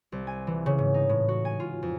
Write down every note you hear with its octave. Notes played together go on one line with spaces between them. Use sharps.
C2
G#5
E3
C#3
G#2
D#4
A2
F#4
G#5
F4
F2